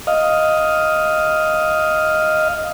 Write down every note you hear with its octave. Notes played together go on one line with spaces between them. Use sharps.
D#5 F5